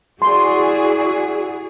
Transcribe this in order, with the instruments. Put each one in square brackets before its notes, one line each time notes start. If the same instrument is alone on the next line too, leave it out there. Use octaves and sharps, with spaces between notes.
[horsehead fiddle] E4 F#4 [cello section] G#4 [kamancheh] D5 G#5 [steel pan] C6